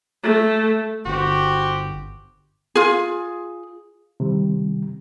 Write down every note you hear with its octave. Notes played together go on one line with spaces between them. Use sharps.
A3
G1 C4 F#4 G4
F4 G#4
C3 D#3 G3